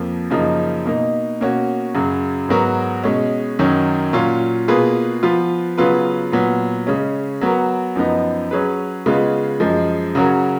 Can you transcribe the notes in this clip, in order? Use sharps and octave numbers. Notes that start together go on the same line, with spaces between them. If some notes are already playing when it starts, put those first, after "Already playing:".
Already playing: F2 F3 A#3
F#2 C#3 F3 A#3 D#4
B2 A#3 D#4
B2 A#3 C#4 F#4
F#2 C#3 F#3
G#2 F#3 B3 F#4 A#4
B2 G#3 C#4
F#2 D#3 F#3 C#4
A#2 F#3 C#4 F4
B2 A#3 F4 G#4 B4
F3 B3 F4 B4
C#3 F#3 B3 F4 B4
A#2 F#3 B3
C#3 G#3 C#4
F#3 B3 F#4 A#4
F#2 F3 B3 D#4
F#3 C#4 G#4 B4
C#3 G#3 B3 F4 B4
F#2 F3 G#3
C#3 F#3 C#4 F#4 A#4